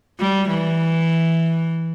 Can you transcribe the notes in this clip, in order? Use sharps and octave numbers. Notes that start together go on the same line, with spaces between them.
G3
E3